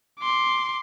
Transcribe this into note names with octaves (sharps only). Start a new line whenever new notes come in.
C6 D6